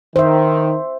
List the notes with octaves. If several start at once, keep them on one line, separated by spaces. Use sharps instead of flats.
D#3 C5 E5